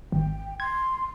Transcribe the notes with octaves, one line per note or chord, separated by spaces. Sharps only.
G#1 G5
C6 G#6